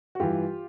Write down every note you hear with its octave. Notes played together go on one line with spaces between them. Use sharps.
F#4
G2 E3 F4 G4